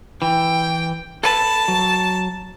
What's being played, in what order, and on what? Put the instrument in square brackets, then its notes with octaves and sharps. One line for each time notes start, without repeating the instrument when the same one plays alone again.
[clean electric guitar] E3 [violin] G5
[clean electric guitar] A4 B4 [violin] A5
[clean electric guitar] F#3